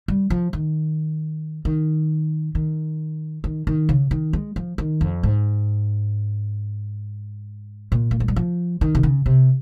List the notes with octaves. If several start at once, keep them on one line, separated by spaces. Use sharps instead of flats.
G3
F3
D#3
D#3
D#3
D#3
D#3
C#3
D#3
G#3
F3
D#3
F2
G#2
A#2
A#3
G#3
G3
F3
D#3
C3
C#3
C3